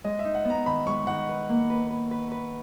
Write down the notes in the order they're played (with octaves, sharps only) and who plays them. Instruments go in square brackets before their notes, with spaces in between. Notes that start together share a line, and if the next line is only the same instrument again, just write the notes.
[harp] G#3 [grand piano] D#5
[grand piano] E5
[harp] D#4
[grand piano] F#5
[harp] B3
[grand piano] A#5
[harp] D#3 [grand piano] B5
[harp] G#3 [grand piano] C#6
[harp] D#3 [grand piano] F#5
[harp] B4
A#3
B4
B4
B4
B4